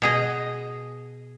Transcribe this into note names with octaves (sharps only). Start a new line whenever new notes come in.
B2 G#4 D#5